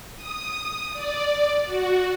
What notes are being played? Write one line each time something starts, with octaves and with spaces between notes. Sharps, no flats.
D#6
D5
F#4